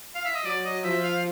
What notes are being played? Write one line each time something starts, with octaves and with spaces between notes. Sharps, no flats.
F5
E5
D#5
F#3 D5
D#5
F3 E5
F5